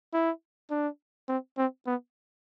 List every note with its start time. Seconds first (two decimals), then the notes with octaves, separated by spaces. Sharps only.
0.13 E4
0.70 D4
1.28 C4
1.57 C4
1.86 B3